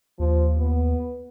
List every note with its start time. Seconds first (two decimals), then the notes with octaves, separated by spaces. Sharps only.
0.19 D#2 F3
0.59 B3